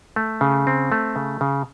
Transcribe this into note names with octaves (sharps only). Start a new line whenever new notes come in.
A3
C#3
C4
A3
C#3
C#3